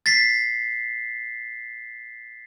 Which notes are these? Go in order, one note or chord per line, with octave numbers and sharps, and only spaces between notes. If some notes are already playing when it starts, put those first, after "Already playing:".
A6 B6 C7